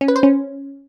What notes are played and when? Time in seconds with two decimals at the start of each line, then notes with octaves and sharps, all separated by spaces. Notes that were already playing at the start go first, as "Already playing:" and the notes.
0.01 C#4
0.08 B4
0.16 C5
0.23 C#4